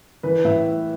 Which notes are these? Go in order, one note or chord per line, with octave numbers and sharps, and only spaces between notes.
E3 B4
A2 E5